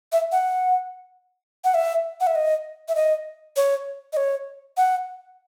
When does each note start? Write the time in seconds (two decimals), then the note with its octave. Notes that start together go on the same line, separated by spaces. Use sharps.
0.12 E5
0.32 F#5
1.64 F#5
1.74 E5
2.20 F#5
2.27 E5
2.35 D#5
2.88 E5
2.95 D#5
3.56 C#5
4.13 D#5
4.17 C#5
4.77 F#5